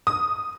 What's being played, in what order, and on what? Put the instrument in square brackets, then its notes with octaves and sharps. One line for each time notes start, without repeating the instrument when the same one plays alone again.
[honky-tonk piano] D#6